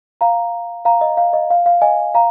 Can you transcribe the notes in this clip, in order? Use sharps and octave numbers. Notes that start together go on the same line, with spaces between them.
F5 A#5
F5 A#5
D#5
F5
D#5
F5
F5
D#5 G#5
F5 A#5